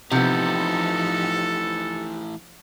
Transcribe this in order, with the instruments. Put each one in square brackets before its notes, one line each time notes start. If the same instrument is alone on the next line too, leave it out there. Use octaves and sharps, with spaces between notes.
[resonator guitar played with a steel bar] C3 B3 [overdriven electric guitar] E3 A3 [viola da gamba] F3 D#4 [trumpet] A4